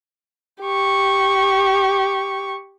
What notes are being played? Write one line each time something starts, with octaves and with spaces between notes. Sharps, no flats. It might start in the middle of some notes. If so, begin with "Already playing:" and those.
G4 C#6